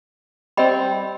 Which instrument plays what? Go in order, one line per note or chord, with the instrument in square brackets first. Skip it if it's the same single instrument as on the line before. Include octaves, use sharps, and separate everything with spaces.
[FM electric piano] G3 C4 [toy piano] D#5 G5 B5